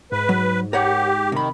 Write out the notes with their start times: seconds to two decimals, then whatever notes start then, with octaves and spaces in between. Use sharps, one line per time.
0.12 G#2 B4
0.29 F#3
0.73 G4 A#4 C#5 F#5
1.32 C3 D#3 B5